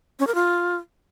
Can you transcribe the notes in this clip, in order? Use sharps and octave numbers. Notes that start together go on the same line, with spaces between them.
C#4
A#4
F4